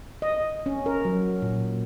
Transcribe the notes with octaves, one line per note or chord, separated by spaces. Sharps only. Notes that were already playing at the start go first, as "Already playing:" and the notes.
D#5
C#4
A#4
F#3
A#2